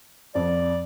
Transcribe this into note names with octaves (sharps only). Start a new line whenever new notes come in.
F2 D5